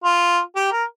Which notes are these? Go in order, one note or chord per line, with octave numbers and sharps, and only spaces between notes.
F4
G4
A#4